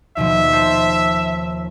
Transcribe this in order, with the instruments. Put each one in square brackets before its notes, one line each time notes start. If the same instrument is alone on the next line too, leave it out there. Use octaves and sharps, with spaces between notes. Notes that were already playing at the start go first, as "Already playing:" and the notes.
[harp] D#2 B2 F3 [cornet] E5
[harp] C5 A5 C6